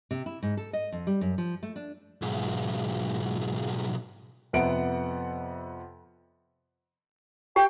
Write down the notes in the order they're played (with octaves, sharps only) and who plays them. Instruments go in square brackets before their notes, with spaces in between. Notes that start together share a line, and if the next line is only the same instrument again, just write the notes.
[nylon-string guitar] C3
E4
G#2
A4
D#5
F2
G3
F#2
F3
A3
D4
[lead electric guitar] B1 G#2
[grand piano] F2 C3 B3 F#5 D7
[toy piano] G4 [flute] G5